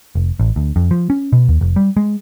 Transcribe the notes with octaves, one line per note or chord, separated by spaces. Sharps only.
F1
A1
D2
F2
F3
C#4
B2
D#2
F1
G3
G#3